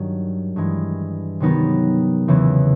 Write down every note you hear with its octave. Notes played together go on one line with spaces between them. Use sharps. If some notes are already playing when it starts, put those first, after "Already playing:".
Already playing: G2 D#3 F#3
G2 E3 G#3
C3 D#3 F#3 B3 D#4
E2 C#3 E3